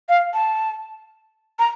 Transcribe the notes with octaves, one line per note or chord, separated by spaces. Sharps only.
F5
A5
A#5